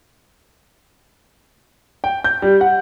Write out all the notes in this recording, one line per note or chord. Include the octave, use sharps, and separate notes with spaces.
G5
G6
G3
F#5